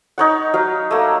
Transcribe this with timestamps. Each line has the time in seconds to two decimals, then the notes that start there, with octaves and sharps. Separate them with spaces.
0.18 D#4 C#5 F#5
0.54 F#3 F5
0.91 A3 A#3